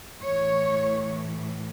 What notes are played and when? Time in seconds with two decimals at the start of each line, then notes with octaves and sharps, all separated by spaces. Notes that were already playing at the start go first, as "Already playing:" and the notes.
0.22 A2 E3 C#5